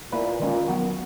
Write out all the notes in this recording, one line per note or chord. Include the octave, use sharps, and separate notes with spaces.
A#2 A#3 E4 B4
A#2 D#3 G#3 C#4
D#3 F#3 B3 F#4